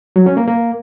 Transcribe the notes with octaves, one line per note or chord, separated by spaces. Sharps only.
F#3
C#4
A#3
A#3